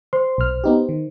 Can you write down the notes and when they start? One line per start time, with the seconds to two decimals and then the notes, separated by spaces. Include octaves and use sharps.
0.13 C5 C6
0.38 B1 F6
0.64 B3 D#4 G4
0.89 D#3